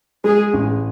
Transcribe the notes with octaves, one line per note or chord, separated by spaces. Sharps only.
G#3 G#4
A1